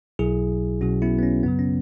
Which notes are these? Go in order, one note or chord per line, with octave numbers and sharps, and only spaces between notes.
B1 B2 F#3 E4 G#4
B1 B2 F#3 C#4 F#4
B3 E4
B3
C#4
F#2 C#3 F#3 B3
C#4